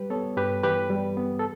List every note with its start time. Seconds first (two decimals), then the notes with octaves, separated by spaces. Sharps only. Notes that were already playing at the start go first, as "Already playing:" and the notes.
Already playing: G3 G4 B4
0.10 B3 A4 C#5
0.37 G2 G4 B4
0.63 E3 G4 B4
0.90 G3
1.17 B3
1.39 A4